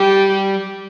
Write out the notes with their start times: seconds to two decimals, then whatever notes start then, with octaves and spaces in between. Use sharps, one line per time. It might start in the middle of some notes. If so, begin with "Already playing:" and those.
Already playing: G3 G4